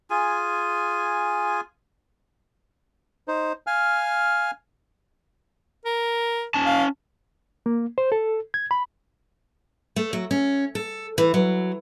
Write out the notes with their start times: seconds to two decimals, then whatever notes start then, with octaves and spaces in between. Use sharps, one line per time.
0.10 F4 G#4 G#5
3.28 D#4 C5
3.67 F5 G#5 F6
5.85 A#4
6.54 C#4 A5
6.66 F5
7.66 A#3
7.98 C5
8.12 A4
8.54 G#6
8.71 B5
9.96 A3
10.13 F#3
10.31 C#4
10.75 A4
11.18 E3
11.34 F#3